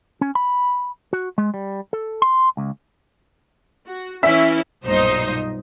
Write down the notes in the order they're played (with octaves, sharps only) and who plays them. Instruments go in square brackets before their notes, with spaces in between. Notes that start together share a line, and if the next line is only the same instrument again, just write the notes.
[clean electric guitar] C#4
B5
F#4
G#3
G3
A4
C6
C#2
[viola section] F#4
[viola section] E3 C#4 E4 [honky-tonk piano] E5
[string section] B1 G2 A#2 D#4 C5 D#5